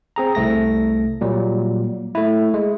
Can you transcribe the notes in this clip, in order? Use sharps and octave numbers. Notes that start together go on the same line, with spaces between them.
C4 G#4 A#5
C2 A3 A#6
A#2 F#3 G3
A3 E4
G#3